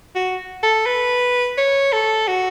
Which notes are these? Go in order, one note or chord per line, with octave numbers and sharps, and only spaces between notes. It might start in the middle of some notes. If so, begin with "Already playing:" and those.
F#4
A4
B4
C#5
A4
F#4